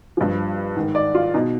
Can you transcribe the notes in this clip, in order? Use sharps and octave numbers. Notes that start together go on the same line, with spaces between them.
G2 F3
G#2 D#3
D5
F4
B2 D#4